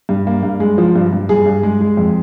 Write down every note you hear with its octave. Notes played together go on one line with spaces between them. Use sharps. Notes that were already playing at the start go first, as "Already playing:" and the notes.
G2
A#3
G2
G#3
F3
G2
G2
G2 G#4
G2
G#3
G#3
F2